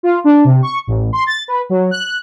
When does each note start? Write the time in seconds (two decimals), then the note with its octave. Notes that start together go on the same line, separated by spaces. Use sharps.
0.03 F4
0.24 D4
0.45 C3
0.63 C#6
0.87 A1
1.13 C6
1.27 A6
1.48 B4
1.70 F#3
1.91 F#6